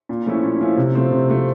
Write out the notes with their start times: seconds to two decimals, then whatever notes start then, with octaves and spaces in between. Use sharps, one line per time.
0.09 A#2
0.26 F3 A3 C#4 E4
0.43 A#2
0.61 F3 A3 C#4 E4
0.77 C3
0.95 F3 A3 C4
1.12 C3
1.29 F3 A3 C4